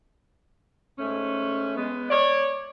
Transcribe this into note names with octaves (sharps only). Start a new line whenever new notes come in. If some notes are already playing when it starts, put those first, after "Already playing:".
G#2 A3 C#4
G#3 B3
C#5 D5